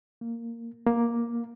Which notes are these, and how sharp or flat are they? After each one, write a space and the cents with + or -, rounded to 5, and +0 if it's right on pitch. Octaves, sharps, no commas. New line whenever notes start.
A#3 -10
A#3 +10